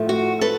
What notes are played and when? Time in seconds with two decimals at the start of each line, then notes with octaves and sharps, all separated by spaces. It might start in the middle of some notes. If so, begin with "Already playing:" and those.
Already playing: A2 F3 A3
0.09 F#4
0.41 A4 B4